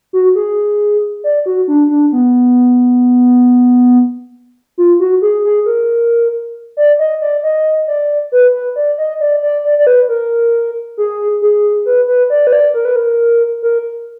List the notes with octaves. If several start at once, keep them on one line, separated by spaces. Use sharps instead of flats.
F#4
G#4
D5
F#4
D4
D4
B3
F4
F#4
G#4
G#4
A#4
D5
D#5
D5
D#5
D5
B4
B4
D5
D#5
D5
D5
D5
D5
B4
A#4
G#4
G#4
B4
B4
D5
B4
D5
A#4
B4
A#4
A#4